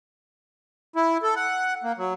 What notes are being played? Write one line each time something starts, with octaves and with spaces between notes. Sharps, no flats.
E4
A4
F#5
A#3
F#3